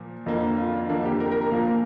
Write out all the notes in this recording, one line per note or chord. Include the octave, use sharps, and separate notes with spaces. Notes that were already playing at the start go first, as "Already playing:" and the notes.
Already playing: A#2 F3 A#3
F2 D3 A#3
F4
D4
F2 D3 A#3 D4
G4
A#4
A#4
A#4
A#2 F3 A#3 F5